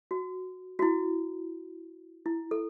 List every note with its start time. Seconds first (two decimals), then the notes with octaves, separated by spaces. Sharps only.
0.11 F#4
0.79 F#4
0.82 E4
2.26 E4
2.51 A4